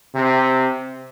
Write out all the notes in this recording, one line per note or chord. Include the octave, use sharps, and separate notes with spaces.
C3